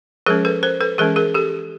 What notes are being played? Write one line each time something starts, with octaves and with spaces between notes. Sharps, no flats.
F3 G#3 C#4 G#4 A#4
A4 B4
A#4 C5
A4 B4
E3 G#3 C#4 G#4 A#4
G#4 A#4
G4 A4